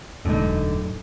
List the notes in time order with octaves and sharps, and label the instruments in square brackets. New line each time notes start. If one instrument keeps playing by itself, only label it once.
[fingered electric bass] E1 G#3 [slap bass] F#2 A2 [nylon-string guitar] D3 D#4